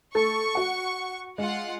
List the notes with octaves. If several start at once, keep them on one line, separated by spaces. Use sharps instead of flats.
A3 A4 C#6
F#4 F#5
G#3 F4 F#5